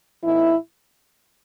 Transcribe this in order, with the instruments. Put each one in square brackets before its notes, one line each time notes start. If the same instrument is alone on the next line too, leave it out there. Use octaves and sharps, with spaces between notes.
[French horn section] A2 E3 B3 D#4 E4